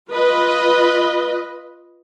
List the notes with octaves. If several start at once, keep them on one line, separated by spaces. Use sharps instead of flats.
F4 B4 D#5